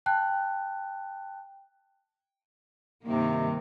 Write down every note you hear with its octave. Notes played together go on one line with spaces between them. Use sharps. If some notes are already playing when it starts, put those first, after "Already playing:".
G5 A5 F#6
G2 C3 D#3 A#3